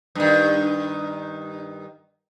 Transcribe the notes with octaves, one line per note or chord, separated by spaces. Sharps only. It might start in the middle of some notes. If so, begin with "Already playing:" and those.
G2 D#3